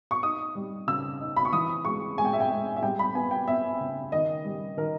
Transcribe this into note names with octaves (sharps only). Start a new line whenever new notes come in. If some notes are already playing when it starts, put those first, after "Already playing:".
C#6
D#4 D#6
G3
C#3 E6
D#4
B5
C#6
E3 D#6
G#3 C#6
G#3 G#5
G5
E5
G5
G#3
E5
G3 G5
B5
B3 G#5
G5
B3 E5
C#3
D#3 D#5
G3
D#3 A#4